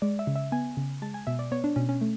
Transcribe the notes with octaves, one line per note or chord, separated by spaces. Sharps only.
G#3 D5
E5
C#3
E5
B3 G#5
C#3
G#3 A5
G#5
B2 E5
D5
B3 C#5
D4
B2 C#4
C#4
A3